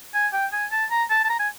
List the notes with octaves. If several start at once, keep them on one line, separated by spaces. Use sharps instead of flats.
G#5
G5
G#5
A5
A#5
A5
A5
A#5
G#5